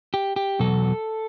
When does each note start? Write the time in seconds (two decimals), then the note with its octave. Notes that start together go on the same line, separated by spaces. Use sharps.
0.14 G4
0.36 G4
0.59 E2 B2 F#3 A4